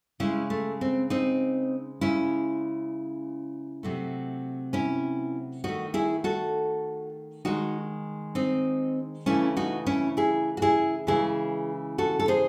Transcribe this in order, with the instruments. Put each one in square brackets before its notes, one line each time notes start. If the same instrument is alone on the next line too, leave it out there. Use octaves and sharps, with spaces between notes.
[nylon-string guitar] C#3 G#3 C#4 E4
A3
C4
C4 D#4
C#3 G#3 C#4 E4
C3 F#3 A3
C#4 E4
D#3 A3 D#4 F#4
E4 G#4
F#4 A4
D#3 G#3 D#4 F#4
C4 D#4
C#3 E3 A3 C#4 E4
D#4 F#4
C#4 E4
E4 G#4
F#4
E4 G#4
C#3 E3 G#3 E4 G#4
F#4 A4
A4
G#4 C5